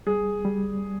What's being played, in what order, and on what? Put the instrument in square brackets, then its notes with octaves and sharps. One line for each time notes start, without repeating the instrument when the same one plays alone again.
[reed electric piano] G3 [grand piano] G#4
[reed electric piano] G3